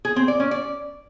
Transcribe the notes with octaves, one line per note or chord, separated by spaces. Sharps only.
G#4
C4
D5
C#4
D5